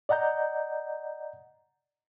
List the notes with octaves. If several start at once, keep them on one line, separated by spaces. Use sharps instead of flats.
D5 D#5 F#5 A#5 G6